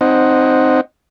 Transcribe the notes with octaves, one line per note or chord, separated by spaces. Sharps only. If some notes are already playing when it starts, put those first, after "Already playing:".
C4 D#4 C5 D#5 F#5